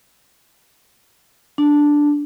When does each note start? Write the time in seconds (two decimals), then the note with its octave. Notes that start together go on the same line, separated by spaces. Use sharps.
1.58 D4